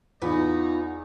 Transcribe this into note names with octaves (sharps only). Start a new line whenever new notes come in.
E2 B3 D#4 F4